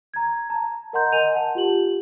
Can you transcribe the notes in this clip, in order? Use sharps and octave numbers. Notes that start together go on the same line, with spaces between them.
A#5 G#6
A5 A#5
A#4 D#5 F#5 A#5 C6 G6
A#4 D#5 G#5 G6 D#7 F7
F#5 A5
F4 G4 F#7